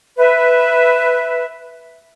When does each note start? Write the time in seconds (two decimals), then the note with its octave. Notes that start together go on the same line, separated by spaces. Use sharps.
0.17 B4 E5